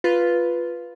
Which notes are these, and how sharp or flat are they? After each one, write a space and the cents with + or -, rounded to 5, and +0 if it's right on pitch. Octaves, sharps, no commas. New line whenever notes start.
F4 +0 B4 +0